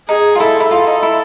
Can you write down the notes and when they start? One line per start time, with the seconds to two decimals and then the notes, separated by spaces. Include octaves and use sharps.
0.09 D#4 G#4
0.35 F4
0.40 E4 A4
0.60 E4
0.71 F4 A4
0.87 D#4
1.03 E4